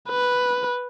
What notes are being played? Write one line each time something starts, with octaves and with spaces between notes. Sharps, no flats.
B4